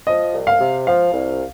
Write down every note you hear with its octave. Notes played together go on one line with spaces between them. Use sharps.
F3 D#5
C2
F5
C3
F3 F5
C2